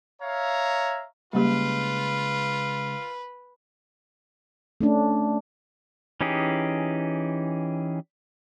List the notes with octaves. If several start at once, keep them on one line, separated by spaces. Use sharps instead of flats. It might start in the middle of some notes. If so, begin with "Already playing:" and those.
C#5 E5 F5 A#5
C#3 G3 G#3 A#3 F4 G4 B4
A3 C#4 D4
E3 C#4 D#4 G4 G#4